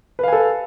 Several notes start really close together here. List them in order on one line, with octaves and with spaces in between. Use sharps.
B4 F5 G#5 A4